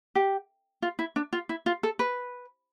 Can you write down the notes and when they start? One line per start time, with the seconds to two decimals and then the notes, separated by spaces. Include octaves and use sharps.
0.15 G4
0.82 F4
0.99 E4
1.16 D4
1.33 F4
1.49 E4
1.66 F4
1.83 A4
1.99 B4